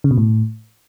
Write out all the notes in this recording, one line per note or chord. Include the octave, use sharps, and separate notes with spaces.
C#3
B2
A2